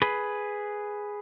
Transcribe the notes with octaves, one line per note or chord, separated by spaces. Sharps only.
G#4 B4